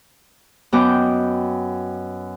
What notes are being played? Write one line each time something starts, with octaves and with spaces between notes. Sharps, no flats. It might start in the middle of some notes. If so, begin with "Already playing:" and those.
F#2 B3 D#5 G5 D6 G6